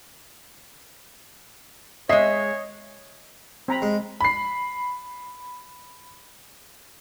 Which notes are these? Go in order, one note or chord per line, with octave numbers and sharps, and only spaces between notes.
G#3 C#5 D#5 E5 C7
C4 A#5 B5
G#3
B5 C7